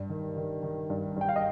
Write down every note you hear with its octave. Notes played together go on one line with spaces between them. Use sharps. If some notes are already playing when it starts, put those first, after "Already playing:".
Already playing: G2
D#3
D#3
D#3
G2
G2 G5
F5
D#5